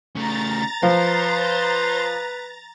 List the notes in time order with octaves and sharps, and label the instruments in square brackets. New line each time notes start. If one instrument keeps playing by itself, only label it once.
[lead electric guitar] C#3 A3 [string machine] A#5 A6
[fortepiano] F3 [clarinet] B4 [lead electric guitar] C5